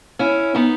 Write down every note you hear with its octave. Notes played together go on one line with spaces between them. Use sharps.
C#4 E4
B3 D#4